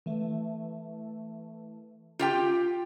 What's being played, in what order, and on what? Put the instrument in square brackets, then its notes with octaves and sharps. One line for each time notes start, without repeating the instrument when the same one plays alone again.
[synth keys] E3 A3
[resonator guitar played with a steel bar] F4 G4 G5